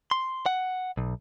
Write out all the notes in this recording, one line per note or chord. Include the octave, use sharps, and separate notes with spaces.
C6
F#5
B1